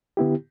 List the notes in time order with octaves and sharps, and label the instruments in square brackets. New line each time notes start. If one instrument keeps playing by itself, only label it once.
[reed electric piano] D3 B3 E4 G4